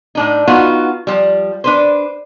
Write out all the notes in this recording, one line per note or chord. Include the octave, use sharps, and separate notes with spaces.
A2 D4 D#4
B3 D#4 F4 F#4
F3 G3
D4 B4 C5